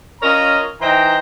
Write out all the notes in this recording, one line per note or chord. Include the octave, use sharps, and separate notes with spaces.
C#4 F4 A#4 C#5 D#5 A#5
E3 D#4 C5 D#5 G5 A#5